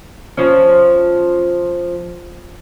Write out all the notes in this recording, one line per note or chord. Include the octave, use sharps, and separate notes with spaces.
F3 C#4